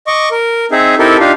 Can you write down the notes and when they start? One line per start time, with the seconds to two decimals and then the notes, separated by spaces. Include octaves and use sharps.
0.07 D#5 C#6 D6
0.31 A#4
0.72 C4 D#4 G#4 E5
0.99 C4 D#4 E4 G4 A4 A#4
1.20 D4 D#4 F4 G4 F5